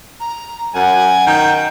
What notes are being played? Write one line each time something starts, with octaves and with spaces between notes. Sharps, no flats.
A#5
F#2 F#5 G#5
D#3 G5